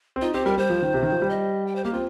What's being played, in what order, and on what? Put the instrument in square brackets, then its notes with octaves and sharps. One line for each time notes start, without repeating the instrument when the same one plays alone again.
[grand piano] C4
[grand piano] D#4 [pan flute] F4
[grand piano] C4 [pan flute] G4
[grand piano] G3 [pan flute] A#4
[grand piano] G3 [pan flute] C5
[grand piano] F3
D#3
C3
D#3
F3
G3
[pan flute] D#5
G5
C5
[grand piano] A#3 [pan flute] G4
[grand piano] C4 [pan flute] F4